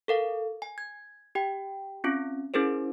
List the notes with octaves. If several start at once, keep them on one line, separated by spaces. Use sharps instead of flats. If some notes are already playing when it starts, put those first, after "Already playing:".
A4 A#4 F5
G#5
G#6
G4 G5
C4 C#4 F4
C#4 E4 G#4 A#4 C5